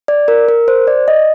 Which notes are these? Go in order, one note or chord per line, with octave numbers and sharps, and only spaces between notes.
D5
A#4
A#4
C5
D5
D#5